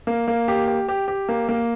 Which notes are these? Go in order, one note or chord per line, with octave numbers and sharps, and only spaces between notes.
A#3
A#3
G4
G4
G4
G4
A#3
A#3